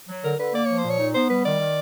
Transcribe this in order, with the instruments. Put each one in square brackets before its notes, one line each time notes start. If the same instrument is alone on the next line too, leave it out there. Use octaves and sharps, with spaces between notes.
[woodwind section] F#3
[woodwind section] D3 [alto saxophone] A#4
[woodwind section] D3 [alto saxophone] B4
[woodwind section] A#3 [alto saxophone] D5
[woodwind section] F3 [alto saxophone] C#5
[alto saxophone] C5
[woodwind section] A#2
[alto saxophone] C#5
[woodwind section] D#4
[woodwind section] B3 [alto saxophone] C5
[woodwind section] G3 [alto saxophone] B4
[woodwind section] D#3 [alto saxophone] D5
[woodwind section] D#3